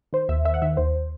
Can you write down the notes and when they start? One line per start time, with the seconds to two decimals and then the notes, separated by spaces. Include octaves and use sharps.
0.13 D#3 C5
0.29 D#2 E5
0.45 D#3 E5
0.54 F#5
0.62 D#3 E5
0.77 D#2 C5